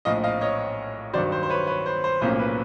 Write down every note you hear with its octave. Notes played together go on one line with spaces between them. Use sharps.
A#1 A2 F3 D#5 F5
D#5 F5
C#5 D#5
G2 D#3 F#3 C5 D5
C5
C5
B4 C#5
B4 C#5
C5
C5
B1 A2 F3 A#3 C#4 C5
B4